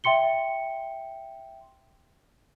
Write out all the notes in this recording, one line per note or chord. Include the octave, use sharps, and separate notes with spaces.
E5 G5 C6 C#7 G7